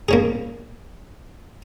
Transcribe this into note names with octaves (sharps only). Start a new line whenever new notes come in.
A#3 C#4 G#4